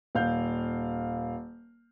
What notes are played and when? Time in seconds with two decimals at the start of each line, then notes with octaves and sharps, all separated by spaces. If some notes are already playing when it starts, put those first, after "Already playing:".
0.15 D#1 F5 G6